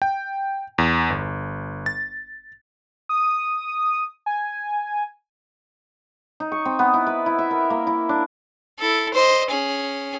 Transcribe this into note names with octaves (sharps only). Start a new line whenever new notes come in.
G5
E2
G1
A6
D#6
G#5
D#4
C#6
C4
B3
E4
B4
E4
E5
A#4
A#3
E4
D4
E4 A4
C5 D#5
C#4 G#4